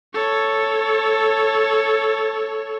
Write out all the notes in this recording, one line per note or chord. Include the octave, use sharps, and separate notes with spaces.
A4 C#5